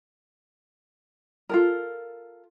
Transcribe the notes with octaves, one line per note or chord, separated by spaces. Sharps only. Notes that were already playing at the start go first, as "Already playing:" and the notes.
F4 A4 A#4